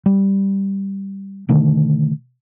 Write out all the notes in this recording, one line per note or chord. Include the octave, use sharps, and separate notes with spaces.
G3
B2 D3 D#3 A3